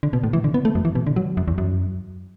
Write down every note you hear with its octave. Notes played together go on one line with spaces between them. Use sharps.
D3
B2
A2
E3
D3
B3
A3
F#2
E3
B2
D3
F#3
F#2
E2
F#2